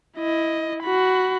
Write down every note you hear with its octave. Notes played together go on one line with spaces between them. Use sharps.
E4 D#5
F#4 B5